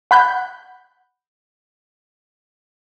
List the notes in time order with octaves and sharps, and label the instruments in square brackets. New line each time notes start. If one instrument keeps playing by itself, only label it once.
[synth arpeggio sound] F#5 B5 F#6 G6